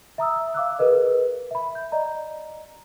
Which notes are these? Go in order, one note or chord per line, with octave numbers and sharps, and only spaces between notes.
E5 A#5 D#6 E6
F5 D6 E6 F#6
G#4 A#4 B4 D#5
E5 B5
G6
D5 D#5 A#5